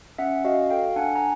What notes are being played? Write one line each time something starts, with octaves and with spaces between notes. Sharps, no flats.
C#4 E5 F#5
F#4 D#5 F5
A4 F5 G5
D4 F#5 G#5
G#5 A#5